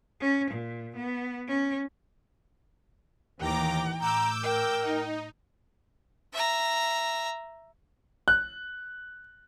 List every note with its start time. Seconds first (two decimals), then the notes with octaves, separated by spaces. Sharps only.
0.21 C#4
0.50 A#2
0.96 B3
1.48 C#4
3.40 D#2 A2 E3 G5 A#5 D6
4.00 A2 A#5 D6 E6 G6
4.44 A#4 G5
4.82 D#4
6.33 E5 A#5
8.28 F#6